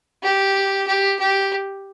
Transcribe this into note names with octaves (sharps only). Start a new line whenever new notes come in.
G4
G4
G4